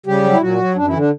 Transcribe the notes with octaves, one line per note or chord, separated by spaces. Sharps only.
C#3 G3 G4
F#3
E4
A#2 F#3 F#4
F#3
F#2 D4
E3 E4
D3
D4